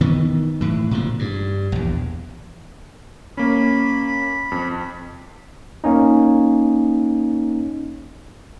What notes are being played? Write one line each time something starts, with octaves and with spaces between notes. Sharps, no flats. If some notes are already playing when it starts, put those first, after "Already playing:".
D#3 E3 B3
A2 E3
A#2 D3 F3
G2
A#1 E2
A#3 C#4 B5
F2
A#3 C#4 D#4